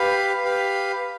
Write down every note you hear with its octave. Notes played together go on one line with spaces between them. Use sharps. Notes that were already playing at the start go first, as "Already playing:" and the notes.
Already playing: G4 B4 F5
G4 B4 F5